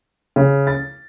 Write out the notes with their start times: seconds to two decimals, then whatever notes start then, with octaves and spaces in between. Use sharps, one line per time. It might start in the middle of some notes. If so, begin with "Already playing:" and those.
0.36 C#3
0.67 A6